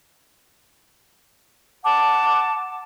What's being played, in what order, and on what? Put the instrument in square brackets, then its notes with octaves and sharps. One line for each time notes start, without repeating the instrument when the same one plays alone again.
[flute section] F#5 A5 D6